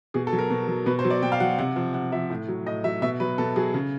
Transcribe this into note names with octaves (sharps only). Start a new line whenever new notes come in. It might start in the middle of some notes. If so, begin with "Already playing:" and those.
B2 G#4
A4
F#3
A#4
B2
F#3
B2 B4
C5
F#3
D5
B2 G5
F5
F#3 F#5
C3 F#5
F3
C3 F#5
F3 E5
A2
F#3
A2 D#5
F#3 E5
B2 E5
F#3 B4
B2 A4
F#3 G#4
C#3